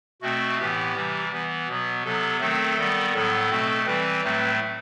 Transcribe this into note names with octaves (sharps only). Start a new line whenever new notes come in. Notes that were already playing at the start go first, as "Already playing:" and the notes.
B2 A3 C4 F#4
A2 E3 B3 G4
C3 E3 G3
E3 B3
B2 F#3 B3
C3 F#3 B3 A4
D#3 F#3 A3 C4 A4
D#3 G3 B3
A2 F#3 B3 A4
B2 A3 C4
E3 G3 C4 B4
A2 F#3 A3 C4